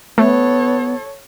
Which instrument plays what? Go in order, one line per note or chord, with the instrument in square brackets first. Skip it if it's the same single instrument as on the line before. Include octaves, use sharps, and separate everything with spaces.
[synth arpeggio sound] A3 [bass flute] B3 [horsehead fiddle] A4 C#5